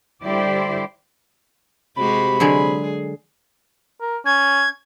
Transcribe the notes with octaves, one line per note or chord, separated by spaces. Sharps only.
D3 G3 E4 G4 C5 D5
C3 G#3 F#4 G4 B5
D3 F#3 G#3 G#4
A#4
C#4 G#6